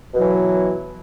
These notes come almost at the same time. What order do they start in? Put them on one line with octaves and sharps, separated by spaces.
B2 F#3 E3